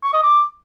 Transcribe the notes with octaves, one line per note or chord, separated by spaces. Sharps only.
C#6
D#5
D6